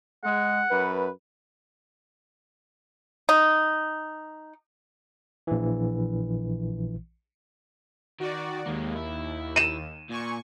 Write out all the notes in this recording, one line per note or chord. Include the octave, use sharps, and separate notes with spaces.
G#3 F#5
F#2 B4
D#4
A#1 E3
D#3 F#4 D5
D#2 G#3 A#3
E4
D#7 E7
A#2 G#5 C#6